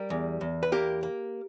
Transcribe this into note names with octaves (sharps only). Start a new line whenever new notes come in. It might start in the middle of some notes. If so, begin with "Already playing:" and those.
Already playing: G3 G4 A#4
E2
E2
B4
A#3 G4 A#4
A#3